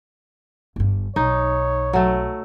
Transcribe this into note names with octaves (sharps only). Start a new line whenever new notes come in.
G1 G2
B1 D#4 C#5
F#3 A3